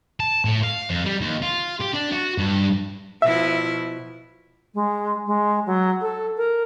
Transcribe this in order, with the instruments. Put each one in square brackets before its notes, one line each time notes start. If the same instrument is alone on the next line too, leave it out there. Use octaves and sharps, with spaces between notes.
[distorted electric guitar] A5
A2
F5
F2
G3
D#2
F4
G4
D4
F#4
G2
[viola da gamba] B2 F3 E4 [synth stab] E5
[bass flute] G#3
G#3
F#3
A4
A#4